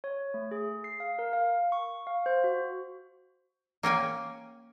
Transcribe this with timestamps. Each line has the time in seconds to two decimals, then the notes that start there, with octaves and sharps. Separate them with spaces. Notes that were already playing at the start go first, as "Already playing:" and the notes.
0.04 C#5
0.34 A3
0.51 G#4
0.84 C7
1.00 F5
1.19 A#4
1.33 F5
1.72 C#6
2.07 F5
2.26 C5
2.44 F#4
3.83 A#3 C#4 G5 G#5